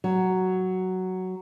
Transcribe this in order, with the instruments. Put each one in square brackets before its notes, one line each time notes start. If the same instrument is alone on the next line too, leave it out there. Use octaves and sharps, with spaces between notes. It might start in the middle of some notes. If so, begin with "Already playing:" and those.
[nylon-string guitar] F#3